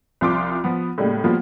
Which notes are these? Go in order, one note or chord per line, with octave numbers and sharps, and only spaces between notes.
C2 F3 F4 C6 D6
F3 B3
A2 C#3 G3 G#3 A#3
F3 G3 A#3 B3 F4 F#4